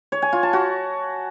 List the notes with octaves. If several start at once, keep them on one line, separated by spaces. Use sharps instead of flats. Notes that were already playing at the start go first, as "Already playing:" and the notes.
C#5
G#5
F4
A5
F#4